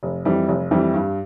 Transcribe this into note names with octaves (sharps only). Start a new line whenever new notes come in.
F1
F2 E3 G3
F1
F2 E3 G3
G2